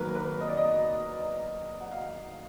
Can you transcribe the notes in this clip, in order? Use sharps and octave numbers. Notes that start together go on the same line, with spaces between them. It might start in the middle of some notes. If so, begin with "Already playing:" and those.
Already playing: G#1 G#2 F#3 A#3 A#4 B4
B4
D#5
D5
D#5
F#5
F5